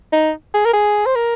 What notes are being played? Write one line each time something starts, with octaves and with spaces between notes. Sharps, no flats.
D#4
G#4
A#4
G#4
C5
A#4